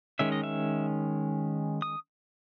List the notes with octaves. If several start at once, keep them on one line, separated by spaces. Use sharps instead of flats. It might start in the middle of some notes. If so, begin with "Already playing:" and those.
D#3 G#3 C#4 E5
D#5
E5
D#6